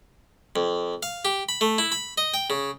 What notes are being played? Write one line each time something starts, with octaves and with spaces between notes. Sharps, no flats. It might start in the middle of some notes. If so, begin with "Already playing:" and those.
F2
F5
G4
B5
A3
E4
B5
D#5
G5
C#3